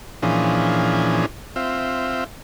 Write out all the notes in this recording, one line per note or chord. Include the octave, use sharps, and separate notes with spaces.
A#2 E3 F3 C#4 D4 G#4
C4 F4 E5